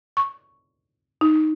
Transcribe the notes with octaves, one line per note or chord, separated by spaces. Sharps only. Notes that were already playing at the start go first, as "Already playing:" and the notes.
C#6
D#4